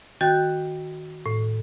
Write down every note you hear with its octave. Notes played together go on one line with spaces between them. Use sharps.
D#3 F#4 G5 F#6 G6 A6
A2